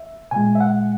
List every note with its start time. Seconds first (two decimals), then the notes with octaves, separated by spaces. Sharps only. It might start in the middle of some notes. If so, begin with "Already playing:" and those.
Already playing: E5
0.31 A#2 G#3 G#5
0.55 E5
0.60 F#5